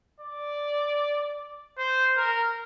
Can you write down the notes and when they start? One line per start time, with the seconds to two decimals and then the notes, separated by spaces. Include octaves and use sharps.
0.21 D5
1.78 C5
2.17 A#4